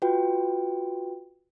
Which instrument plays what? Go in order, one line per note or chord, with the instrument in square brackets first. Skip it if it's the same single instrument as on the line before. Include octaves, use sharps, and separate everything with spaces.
[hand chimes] F4 F#4 B4 G5